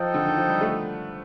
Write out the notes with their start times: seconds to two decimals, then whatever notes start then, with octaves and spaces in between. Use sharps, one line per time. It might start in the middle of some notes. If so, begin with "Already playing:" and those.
Already playing: F3 D#4 A4 D#5 G5
0.14 D3
0.26 D#3
0.37 F3
0.48 G3
0.61 A3